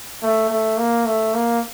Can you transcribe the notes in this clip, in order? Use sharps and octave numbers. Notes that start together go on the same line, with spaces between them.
A3
A3
A#3
A3
A#3